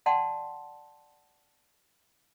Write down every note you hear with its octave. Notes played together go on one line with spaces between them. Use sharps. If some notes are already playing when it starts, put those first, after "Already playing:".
D5 F#5 G5 A5 C6